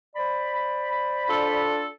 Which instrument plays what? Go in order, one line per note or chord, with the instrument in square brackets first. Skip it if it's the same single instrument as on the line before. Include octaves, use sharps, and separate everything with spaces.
[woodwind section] C5 D5 B5
[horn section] D4 F4 A4